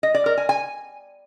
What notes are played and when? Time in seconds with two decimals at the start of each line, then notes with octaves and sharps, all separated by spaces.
0.03 D#5
0.14 D5
0.26 A#4
0.37 G#5
0.49 G#5